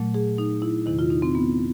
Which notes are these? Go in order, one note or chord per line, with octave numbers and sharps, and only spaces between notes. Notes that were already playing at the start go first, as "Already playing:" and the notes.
Already playing: A#2 F#3 A3
G#4
D#4
E4
E2 C3 D#3 E4
F4
D#4
C4
B3